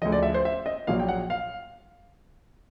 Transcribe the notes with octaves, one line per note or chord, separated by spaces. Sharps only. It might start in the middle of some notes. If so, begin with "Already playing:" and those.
D2 C#3 F3 D#5
D5
E5
C5
E5
D#5
A#1 A#2 F#3 F5
G5
F#5
F5